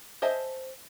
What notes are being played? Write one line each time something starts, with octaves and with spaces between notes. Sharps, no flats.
C5 D#5 E5 G#5 A5